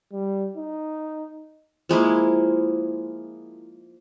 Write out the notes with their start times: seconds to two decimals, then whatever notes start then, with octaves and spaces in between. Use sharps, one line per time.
0.13 G3
0.57 D#4
1.89 F3 G#3 A#3 E4